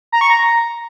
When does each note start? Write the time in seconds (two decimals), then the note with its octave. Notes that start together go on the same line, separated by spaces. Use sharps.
0.12 A#5
0.21 C#6
0.30 A#5